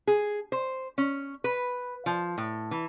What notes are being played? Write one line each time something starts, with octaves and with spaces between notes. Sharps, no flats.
G#4
C5
C#4
B4
F3
A2
E3